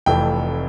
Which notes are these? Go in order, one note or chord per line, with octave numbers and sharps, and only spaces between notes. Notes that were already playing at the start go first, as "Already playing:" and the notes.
F1 F2 E3 A3 G5